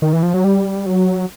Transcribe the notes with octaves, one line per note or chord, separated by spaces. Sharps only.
D#3
E3
F3
F#3
G3
F#3